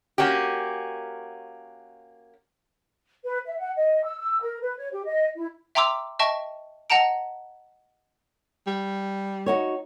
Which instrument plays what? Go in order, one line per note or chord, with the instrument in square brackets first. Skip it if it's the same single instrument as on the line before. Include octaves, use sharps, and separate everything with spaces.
[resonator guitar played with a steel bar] A#3 C#4 F#4 G4
[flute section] B4
E5
F#5
D#5
E6
E6
A#4
B4
C#5
G4
D#5
E4
[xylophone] E5 G5 A#5 C6 D6 E6
D#5 E5 G5 A5 C#6
D#5 F#5 A5 A#5 D7
[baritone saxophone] G3
[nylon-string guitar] D#4 F#4 C#5